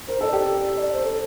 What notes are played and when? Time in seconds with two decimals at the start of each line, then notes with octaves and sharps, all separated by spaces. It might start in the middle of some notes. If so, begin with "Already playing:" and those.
0.08 A#4 C5
0.21 A4 D#5
0.27 D5
0.33 G4
0.76 D#5
0.81 D5
0.93 C5
1.05 A4